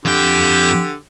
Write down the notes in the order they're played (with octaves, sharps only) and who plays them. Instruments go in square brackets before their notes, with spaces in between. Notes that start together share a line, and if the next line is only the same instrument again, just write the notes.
[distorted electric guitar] F2 G5 [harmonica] D3 G4